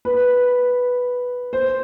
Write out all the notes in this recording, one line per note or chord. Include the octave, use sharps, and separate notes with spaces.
B4
C5